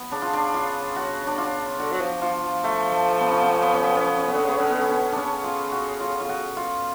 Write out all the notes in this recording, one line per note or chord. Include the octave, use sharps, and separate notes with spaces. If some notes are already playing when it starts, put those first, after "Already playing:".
Already playing: B3
C#3 D4
F4
D4
F4
F#4
D4
F4
D3 F#4
F#3
F3
F3 F4
F3
A3
A3
B3
C#4
B3
C#4
B3
C#4
B3
C#4
B3
C#4
D3 B3
C#4
C#3 B3
D3 C#4
D3 B3
C#4
B3
C#3 C#4 D4
F4
F#4
F4
F4
F#4
F4